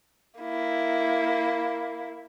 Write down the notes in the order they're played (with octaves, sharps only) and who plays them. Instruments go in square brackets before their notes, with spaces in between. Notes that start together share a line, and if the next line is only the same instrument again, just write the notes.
[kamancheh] A#3 E4